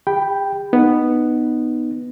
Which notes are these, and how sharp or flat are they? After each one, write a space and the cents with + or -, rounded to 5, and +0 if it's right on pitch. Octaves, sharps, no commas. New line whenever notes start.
G4 +45 G5 +0 B5 +0
B3 +0 D#4 -20